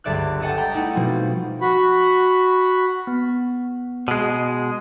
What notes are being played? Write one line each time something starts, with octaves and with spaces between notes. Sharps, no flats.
G1 C#2 D5 E5 F#6
A4 D5 D#5 F#5 G5 A5
D5 G5 A#5 B5 D#6
A3 D#4 E4 F#5
B2 F3 G3 C4
F#4 B5
B3
B2 G#3